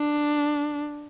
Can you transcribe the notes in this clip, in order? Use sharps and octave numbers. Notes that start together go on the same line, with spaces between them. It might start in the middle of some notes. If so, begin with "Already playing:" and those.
Already playing: D4